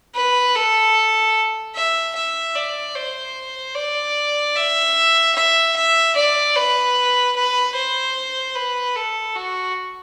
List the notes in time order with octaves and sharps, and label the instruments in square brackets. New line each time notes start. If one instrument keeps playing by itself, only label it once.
[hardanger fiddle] B4
A4
E5
E5
D5
C5
D5
E5
E5
E5
D5
B4
B4
C5
B4
A4
F#4